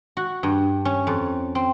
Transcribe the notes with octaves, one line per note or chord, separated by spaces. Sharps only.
F#4
G2
C#4
F2
C4